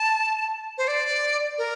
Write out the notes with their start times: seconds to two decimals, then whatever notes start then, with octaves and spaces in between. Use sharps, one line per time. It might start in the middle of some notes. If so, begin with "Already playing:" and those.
Already playing: A5
0.78 C5
0.88 D5
1.58 A#4